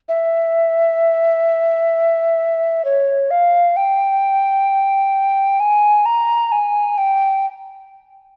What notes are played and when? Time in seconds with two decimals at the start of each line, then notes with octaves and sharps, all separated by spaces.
0.09 E5
2.85 C#5
3.31 F5
3.76 G5
5.60 G#5
6.06 A#5
6.52 G#5
6.98 G5